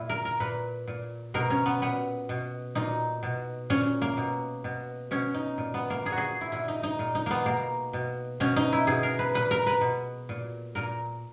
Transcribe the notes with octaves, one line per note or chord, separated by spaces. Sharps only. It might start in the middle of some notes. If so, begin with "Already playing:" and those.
Already playing: A#2 E4
A#4
A#4
A#2 B4
A#2
B2 A#4
C#4
B3
A#2 B3
B2
A#2 D#4
B2
A#2 C#4
A#3
B2
B2
B2 C#4
D#4
A#2
B3
A#3
A#2 G#4
F#4
G#4
E4
A#2 E4
D#4
D#4
A#2
D#4
A#3 B3
B2 A#3
B2
B2 C#4
D#4
E4
B2 G#4
A#4
B4
A#2 B4
A#4
B4
B2
A#2
A#2 A#4